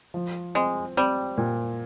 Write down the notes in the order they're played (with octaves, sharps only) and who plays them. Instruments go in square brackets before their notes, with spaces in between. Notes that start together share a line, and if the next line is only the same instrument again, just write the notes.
[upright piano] F3
[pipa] G#3 [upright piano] C4
[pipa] G3 [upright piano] C4
[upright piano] A#2